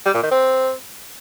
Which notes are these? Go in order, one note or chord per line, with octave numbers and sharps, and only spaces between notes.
G3
A#2
D#3
C4